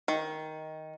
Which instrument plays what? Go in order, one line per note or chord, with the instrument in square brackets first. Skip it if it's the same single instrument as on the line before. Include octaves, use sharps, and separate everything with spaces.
[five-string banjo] D#3